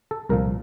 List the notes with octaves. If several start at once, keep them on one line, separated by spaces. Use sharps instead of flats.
A4
C2 A#2 F3 A#4